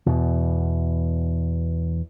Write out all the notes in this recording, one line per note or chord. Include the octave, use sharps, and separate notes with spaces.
E2 B2 E3